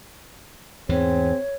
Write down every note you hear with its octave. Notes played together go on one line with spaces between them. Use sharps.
E2 G#2 E3 C4 G#4 C#5